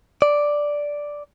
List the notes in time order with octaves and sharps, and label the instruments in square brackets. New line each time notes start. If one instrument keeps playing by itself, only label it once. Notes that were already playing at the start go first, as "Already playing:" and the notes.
[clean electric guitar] D5